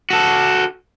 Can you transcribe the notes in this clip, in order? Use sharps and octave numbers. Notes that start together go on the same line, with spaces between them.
F#4 A4